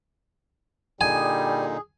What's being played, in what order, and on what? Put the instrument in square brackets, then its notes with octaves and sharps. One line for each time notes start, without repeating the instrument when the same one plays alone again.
[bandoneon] A#2 D3 D#4 [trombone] G3 [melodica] G#4 [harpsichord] G#5